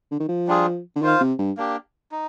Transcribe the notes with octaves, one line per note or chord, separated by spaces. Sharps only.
D3
D#3
F3
G3 D4 F4 G#4
D3
D#3 F4 C5 F5
C3
G2
A#3 D4 G4
D#4